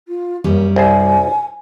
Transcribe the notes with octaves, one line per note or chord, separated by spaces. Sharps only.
F4
F#2 G3 A#3 C#4
C2 G#4 C5 G#5